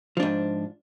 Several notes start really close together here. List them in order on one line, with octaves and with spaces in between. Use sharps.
F3 D4 G#2